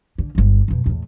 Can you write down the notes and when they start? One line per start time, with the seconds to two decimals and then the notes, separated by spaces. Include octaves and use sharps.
0.18 D3
0.35 G1 D3
0.68 F2 B2
0.86 E2 A2